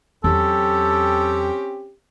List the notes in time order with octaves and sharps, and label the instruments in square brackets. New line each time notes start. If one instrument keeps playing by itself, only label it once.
[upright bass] E2 F#3 [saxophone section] C4 C#4 G4 [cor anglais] A4